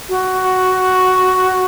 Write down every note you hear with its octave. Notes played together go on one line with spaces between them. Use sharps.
F#4